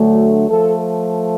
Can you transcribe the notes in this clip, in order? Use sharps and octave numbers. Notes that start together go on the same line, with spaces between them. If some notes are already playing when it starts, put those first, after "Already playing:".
Already playing: D2 D3 F#3 A3
F3 A3 A4